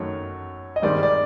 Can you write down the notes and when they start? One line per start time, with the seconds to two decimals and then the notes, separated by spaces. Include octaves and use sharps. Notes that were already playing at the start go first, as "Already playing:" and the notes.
Already playing: F#2 D#3 F#3 A3 C#5
0.76 D#5
0.82 G2 D#3 G#3 C4 D#4 D5
1.03 D5